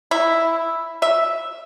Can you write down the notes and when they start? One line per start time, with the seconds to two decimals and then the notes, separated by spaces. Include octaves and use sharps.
0.11 E4
1.02 E5